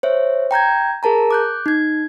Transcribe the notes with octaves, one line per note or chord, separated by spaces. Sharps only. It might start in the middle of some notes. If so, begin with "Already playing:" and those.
C5 C#5 E5
G5 A#5 G6 G#6
G#4 A#4 A5 A#5
D6 F#6 G6
D#4 G#6